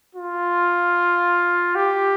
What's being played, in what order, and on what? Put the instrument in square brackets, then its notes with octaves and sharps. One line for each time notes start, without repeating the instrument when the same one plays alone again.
[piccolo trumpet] F4
G4